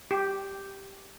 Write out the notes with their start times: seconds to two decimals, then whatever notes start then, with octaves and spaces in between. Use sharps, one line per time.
0.11 G4